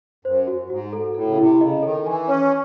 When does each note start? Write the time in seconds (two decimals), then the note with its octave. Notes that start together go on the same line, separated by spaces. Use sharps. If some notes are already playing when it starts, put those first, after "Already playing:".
0.25 F#2 C5
0.47 F#4
0.69 G#2 F#4
0.93 A4
1.14 A2 A4
1.27 C#3
1.37 C3 E4
1.60 C#3 D#5
1.83 D#3 A4
2.06 E3 G#5
2.28 C#4 C#5